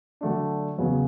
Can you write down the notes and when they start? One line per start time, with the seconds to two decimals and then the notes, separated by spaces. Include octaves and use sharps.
0.21 D3 F#3 A3 D4
0.78 E2 C#3 F#3 B3